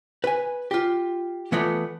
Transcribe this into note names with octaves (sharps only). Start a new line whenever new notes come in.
B4 G#5
F4 G4
E3 A3 B3 F4 D5